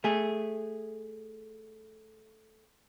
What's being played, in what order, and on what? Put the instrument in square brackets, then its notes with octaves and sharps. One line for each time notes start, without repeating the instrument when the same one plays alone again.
[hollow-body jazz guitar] A3 G#4